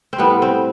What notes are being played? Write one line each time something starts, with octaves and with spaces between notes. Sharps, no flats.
C4
A2 G3 B3
C4